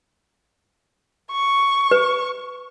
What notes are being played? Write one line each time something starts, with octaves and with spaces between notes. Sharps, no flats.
C#6
B4